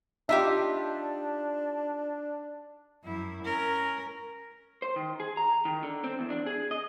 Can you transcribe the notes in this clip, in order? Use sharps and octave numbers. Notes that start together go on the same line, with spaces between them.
D4 D#4 F4 G4 E5
F#2 E4
C#4 A#4
C5
D#3
G#4
A#5
D#3
D3
C4
E2
D4
G#4
D#5